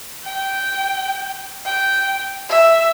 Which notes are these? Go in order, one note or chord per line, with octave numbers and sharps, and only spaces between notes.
G5
G5
E5